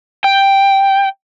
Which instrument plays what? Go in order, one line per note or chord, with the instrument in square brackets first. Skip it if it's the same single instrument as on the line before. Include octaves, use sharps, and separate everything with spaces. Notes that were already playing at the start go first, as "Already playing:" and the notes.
[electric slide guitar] G5